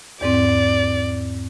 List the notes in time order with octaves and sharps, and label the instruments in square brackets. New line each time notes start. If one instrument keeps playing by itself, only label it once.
[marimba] E2 G#2 C4 [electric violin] D5